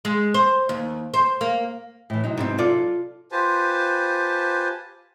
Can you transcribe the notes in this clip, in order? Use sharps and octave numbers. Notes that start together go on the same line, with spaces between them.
G#3
C5
D#2
C5
A#3
A2 E3
C3 F#3 D#4
G#2 B2 C4
F4 A4 D5
F4 G4 B4 C5 G#5 A5